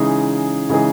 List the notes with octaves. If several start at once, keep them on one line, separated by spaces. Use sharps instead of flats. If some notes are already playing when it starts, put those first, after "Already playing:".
Already playing: C#3 E3 G#3 D#4 G#4
C#3 E3 G#3 D#4 G#4